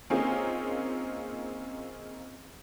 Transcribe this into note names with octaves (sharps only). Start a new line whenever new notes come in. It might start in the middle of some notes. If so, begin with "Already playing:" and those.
A#3 C4 C#4 D#4 F4 G#4